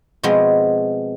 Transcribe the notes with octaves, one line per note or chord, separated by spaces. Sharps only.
B2 F3 G#3 B3 C4